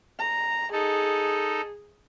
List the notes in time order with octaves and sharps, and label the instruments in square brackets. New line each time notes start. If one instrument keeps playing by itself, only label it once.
[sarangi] A#5
[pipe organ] D#4 A4 [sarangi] G#4